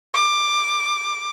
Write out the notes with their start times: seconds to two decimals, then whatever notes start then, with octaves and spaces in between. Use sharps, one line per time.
0.14 D6